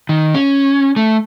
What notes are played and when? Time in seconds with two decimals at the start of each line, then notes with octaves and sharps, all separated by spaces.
0.09 D#3
0.34 C#4
0.96 A3